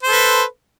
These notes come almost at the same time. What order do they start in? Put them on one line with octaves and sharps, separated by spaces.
C5 A4 B4